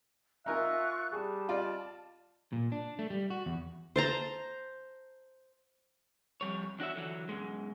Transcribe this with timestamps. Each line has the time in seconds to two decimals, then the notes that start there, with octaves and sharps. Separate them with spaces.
0.46 D#4 F4 A#4 E5 G#5 C#6 F#6
1.12 G3 G#4 A5
1.49 F4 D5 D#5
2.53 A#2
2.72 D4
2.99 A3
3.10 G3
3.30 F#4
3.46 E2
3.96 C5 A5 A#5
6.41 F2 G3 C#5
6.79 E2 D4 F#4 C#5 E5
6.96 D3 E3 F#3
7.29 F#2 B2 G#3